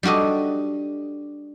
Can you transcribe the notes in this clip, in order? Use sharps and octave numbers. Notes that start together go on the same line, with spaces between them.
G3 D4 F#4 A4 D#5